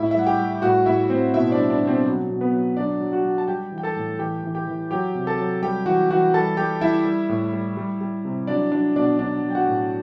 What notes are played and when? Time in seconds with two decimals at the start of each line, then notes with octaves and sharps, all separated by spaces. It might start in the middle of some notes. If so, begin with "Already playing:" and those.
Already playing: A2 E4 E5
0.11 E5
0.15 G3 F#5
0.27 G4 G5
0.39 G3
0.62 A2 F#4 F#5
0.86 A2 E4 E5
1.10 A2 C4 C5
1.34 B2 E4 E5
1.47 C5
1.52 D4 D5
1.57 G3
1.70 D4 D5
1.82 B2
1.87 C4 C5
2.05 F#3
2.29 B2
2.41 B3 B4
2.53 F#3
2.77 F#3 D4 D5
3.00 F#3
3.12 F#4 F#5
3.25 F#3
3.38 A5
3.48 G3 G4 G5
3.72 E3
3.78 G5
3.83 A4 A5
3.96 A2
4.19 E3 G4 G5
4.44 E3
4.55 G4 G5
4.68 E3
4.91 F#3 G4 G5
5.15 C3
5.27 A4 A5
5.39 F#3
5.63 G3 G4 G5
5.86 E3 F#4 F#5
6.10 E3 F#4 F#5
6.34 G3 A4 A5
6.57 G3 G4 G5
6.81 G3 E4 E5
7.05 G3
7.29 A2
7.53 G3
7.77 G3
8.01 G3
8.25 C3
8.47 F#3 D4 D5
8.72 F#3 D4 D5
8.96 B2 D4 D5
9.19 F#3 D4 D5
9.43 F#3
9.50 G5
9.55 F#4 F#5
9.67 A2